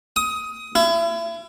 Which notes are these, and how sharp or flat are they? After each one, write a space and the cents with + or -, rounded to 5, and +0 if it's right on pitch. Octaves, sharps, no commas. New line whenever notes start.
D#6 +20
E4 +35